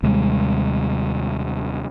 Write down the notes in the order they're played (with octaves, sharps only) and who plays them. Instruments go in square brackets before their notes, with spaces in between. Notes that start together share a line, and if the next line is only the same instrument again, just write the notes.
[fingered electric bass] D#2 C3 G3 G#3